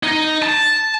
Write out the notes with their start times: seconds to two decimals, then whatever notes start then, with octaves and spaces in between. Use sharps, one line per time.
0.03 D#4
0.42 A5